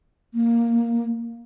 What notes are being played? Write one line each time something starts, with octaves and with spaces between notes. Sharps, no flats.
A#3